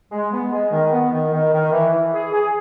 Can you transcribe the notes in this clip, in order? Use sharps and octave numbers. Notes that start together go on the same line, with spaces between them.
G#3
B3
G#3
D#3
B3
D#3
D#3
D#3
E3
E3
G#4
G#4